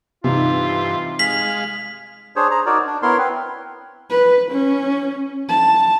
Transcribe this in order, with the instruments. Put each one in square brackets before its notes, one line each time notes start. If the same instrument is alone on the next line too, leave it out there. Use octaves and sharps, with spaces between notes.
[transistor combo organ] G2 E3 [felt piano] C3 D#4 [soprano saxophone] F4
[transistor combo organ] G#3 F5 [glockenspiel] B6 F#7
[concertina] D4 G#4 C5 C#5
G#4 C5 A#5
D#4 F#4 A#4 C#5 D5
D4
B3 E4 A#4 C#5 C6
C4 B4
[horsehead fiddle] B4
C#4
A5